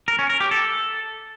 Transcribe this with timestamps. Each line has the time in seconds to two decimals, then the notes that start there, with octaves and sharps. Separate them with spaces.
0.08 A#4
0.19 C#4
0.30 A#4
0.40 G4
0.51 A4